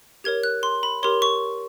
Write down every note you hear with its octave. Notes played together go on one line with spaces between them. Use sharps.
G4 A#4 C#5 G#6
F#6
C6
B5
G4 A#4 C#5 C6
C#6